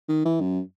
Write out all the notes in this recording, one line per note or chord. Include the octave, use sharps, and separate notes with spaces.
D#3
E3
F#2